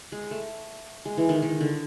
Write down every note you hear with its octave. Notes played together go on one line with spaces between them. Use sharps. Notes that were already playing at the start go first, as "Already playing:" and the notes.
G#3
A3
G#3
E3
D#3
D#3
D3